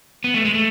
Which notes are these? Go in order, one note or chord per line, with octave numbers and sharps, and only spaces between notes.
B3
A3
G#3
A3